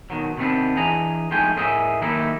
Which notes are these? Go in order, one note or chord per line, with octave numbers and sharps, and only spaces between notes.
B2 D#3 F#3
C3 D#3 A3 B3 C4 D4
E3 D4 G#4 D#5 A#5
F3 G#3 A3 D#4 G5 G#5
A2 C#4 G#4 A#4 D#5 E5
D#3 F#3 A3 A#3 D#4 E4